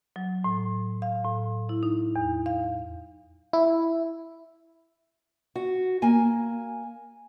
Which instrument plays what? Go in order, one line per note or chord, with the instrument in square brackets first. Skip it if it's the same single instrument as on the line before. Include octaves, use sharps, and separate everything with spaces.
[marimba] F#3
A2
F5
A2
E4
D#4
E2
F5
[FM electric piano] E4
[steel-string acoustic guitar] F#4
A#3 G#5